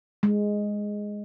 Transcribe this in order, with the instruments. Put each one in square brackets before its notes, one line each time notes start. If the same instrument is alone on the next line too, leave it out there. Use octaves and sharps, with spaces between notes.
[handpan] G#3